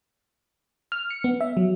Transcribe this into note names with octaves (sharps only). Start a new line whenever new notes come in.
F6
C#7
B3
E5
F#3